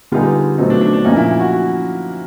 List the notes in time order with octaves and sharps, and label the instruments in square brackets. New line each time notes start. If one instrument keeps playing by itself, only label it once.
[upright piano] D3 G3 B3 D#4 G#4 [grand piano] F4
[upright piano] B2 F#3 A3 C4 [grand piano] D#4
[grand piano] D4
D4
D4
[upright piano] A#2 F3 A#3 C#4 [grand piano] D#4
[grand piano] E4
F#4